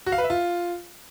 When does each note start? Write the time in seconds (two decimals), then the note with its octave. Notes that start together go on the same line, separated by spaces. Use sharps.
0.06 F#4
0.12 F5
0.18 B4
0.24 E5
0.30 F4